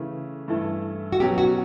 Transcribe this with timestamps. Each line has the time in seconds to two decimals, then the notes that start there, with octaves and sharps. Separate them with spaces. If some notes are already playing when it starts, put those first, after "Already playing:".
Already playing: C#3 E3 A3
0.48 G2 E3 A3 E4 A4
1.12 F#4
1.20 B2 F#3 C#4 G4
1.38 F#4